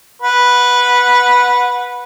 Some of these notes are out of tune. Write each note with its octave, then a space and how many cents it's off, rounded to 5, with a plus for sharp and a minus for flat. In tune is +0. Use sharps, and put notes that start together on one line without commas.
B4 -5 F#5 -25